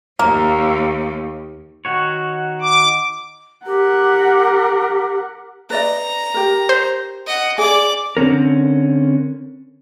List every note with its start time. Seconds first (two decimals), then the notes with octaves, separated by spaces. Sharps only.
0.19 D#2 A#3
1.85 D#3 F#4 C#5
2.62 D6
3.66 G4 A#4 F#5
5.70 B4 D5 D#5 A#5
6.34 G4 A#4
6.69 C5
7.27 D#5 F#5
7.58 G#4 D5 G#5 D6
8.17 D3 C4 C#4 A#4